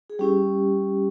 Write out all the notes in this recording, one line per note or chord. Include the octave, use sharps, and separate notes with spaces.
G#4
G3 C#4 E4 G4